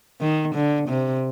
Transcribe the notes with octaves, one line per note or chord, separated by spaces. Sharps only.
D#3
D3
C3